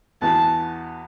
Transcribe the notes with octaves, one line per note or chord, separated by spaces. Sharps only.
E2 E3 B3 F#4 A5